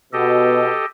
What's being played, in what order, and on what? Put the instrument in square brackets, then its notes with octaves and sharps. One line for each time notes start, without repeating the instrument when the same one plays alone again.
[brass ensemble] B2 [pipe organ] G4 A4 D#5